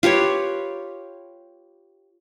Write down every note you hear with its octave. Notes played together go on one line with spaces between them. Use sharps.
F4 G4 B4 C#5